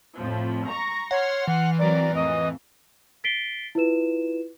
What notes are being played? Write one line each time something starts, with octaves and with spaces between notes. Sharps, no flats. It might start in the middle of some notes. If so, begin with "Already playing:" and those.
F2 A2 F3
A#5 C#6 A#6
C#5 F#5 C6 F6
E3 F#5
F#3 C4 A#4 D5
F2 A2 D#5
A6 B6 C7 D7 G7
E4 F4 B4 E7